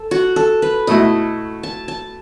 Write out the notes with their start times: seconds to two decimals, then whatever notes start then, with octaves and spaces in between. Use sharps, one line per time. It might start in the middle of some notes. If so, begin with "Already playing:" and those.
Already playing: A4
0.11 F#4
0.36 A4
0.62 B4
0.87 B2 A3 E4 D#5
1.63 A5
1.88 A5